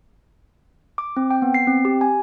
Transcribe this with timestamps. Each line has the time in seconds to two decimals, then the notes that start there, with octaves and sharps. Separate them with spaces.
0.98 D6
1.17 C4
1.30 G5
1.42 B3
1.54 C7
1.67 C4
1.85 G4
2.01 G#5